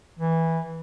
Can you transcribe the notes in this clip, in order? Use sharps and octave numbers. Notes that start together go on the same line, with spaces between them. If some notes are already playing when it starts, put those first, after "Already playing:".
E3